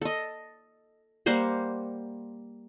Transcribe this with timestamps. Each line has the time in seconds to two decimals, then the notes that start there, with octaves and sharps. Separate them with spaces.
0.01 A4 D#5
1.26 G3 A#3 C5 F#5